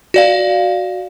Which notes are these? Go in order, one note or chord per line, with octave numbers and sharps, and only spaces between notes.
F#4 D5 F5